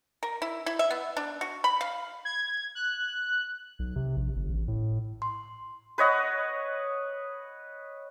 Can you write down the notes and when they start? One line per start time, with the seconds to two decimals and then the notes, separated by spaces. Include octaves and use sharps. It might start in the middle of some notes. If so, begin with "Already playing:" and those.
0.23 A#4
0.42 E4
0.66 E4
0.79 E5
0.91 B3
1.17 D4
1.41 F#4
1.64 B5
1.81 F5
2.25 G#6
2.75 F#6
3.79 B1
3.96 C3
4.17 A#1
4.36 G1
4.49 A1
4.68 A2
5.22 C6
5.98 B4 C#5 D#5 F#5